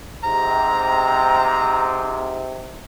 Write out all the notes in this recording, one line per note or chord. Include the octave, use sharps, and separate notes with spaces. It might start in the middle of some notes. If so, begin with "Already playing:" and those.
G#2 C3 A#5